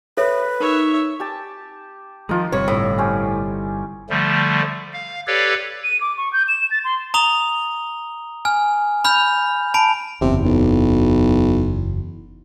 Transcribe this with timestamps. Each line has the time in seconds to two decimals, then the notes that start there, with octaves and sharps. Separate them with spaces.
0.17 A4 B4 C#5 E5
0.60 D#4 A#4 C#5 E5
1.20 G4 A5
2.29 D#3 F3 G#3 D#4 F4
2.52 G1 C3 G3 C#5
2.68 A2 D#6
2.98 C4 C#4 G4
4.10 D3 F3 G3 A3
4.93 F5
5.27 G4 A4 B4 C#5 D5 F5
5.84 D#7
6.01 D6
6.17 C#6
6.33 G6
6.48 E7
6.71 A6
6.84 C6
7.14 A#5 D#6 F7 G7
8.45 G#5 F6
9.05 B5 F6 G6 F7
9.74 A5 B5 D7
10.21 F#1 E2 C3
10.45 B1